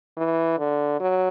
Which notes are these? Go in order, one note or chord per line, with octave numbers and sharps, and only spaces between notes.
E3
D3
F#3